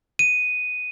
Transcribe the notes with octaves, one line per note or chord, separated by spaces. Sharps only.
D#7